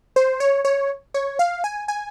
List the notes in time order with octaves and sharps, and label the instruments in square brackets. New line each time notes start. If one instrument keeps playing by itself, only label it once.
[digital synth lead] C5
C#5
C#5
C#5
F5
G#5
G#5